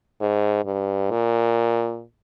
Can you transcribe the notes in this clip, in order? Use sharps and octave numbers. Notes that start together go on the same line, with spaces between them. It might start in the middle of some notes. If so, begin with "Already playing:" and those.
G#2
G2
A#2